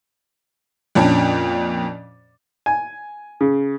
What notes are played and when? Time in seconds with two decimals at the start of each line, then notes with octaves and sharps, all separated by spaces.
0.95 F2 A#2 C#4 D4
2.66 G#5
3.41 C#3